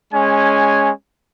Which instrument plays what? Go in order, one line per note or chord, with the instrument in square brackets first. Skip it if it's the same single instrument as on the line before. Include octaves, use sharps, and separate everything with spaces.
[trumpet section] G#3 C#4 G#5